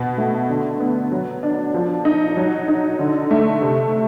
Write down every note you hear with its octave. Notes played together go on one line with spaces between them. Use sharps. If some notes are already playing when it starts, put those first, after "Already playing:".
Already playing: B2
A3
D3
B3
F#3
D4
F3
D#4
F#3
D#4
D3
A3
C3